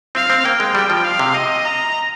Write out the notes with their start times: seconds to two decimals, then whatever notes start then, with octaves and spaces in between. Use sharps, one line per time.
0.15 C4 F5
0.30 C4
0.45 A#3 G5
0.60 G#3
0.75 G3 G5
0.90 F3
1.05 F5
1.19 C3
1.35 D#5
1.65 A#5